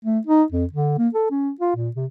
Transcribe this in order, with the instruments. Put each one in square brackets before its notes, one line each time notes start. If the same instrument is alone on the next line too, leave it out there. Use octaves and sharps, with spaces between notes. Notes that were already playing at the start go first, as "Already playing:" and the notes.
[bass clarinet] A3
D#4
F2
D3
A#3
A4
C#4
F4
A#2
C3